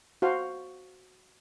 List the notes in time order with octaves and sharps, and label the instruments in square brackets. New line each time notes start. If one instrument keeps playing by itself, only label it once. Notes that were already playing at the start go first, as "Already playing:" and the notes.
[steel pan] F#4 C5 F5